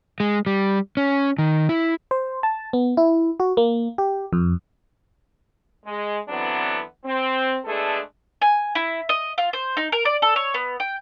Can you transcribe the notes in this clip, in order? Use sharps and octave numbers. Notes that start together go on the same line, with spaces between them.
G#3
G3
C#4
D#3
E4
C5
A5
B3
E4
F#4
A#3
G4
F2
G#3
D3 E3 F#3 B3 C4 D4
C4
G#3 A3 B3 D4 G#4 A4
G#5
E4
D#5
F4
C5
D#4
A#4
D5
A4
C#5
B3
G5